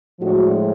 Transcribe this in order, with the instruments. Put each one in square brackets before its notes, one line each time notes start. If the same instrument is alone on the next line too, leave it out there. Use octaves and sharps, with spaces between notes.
[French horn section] A2 F3 G#3 D4 F#4